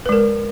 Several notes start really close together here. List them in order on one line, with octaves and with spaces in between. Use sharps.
B4 G#3 A#4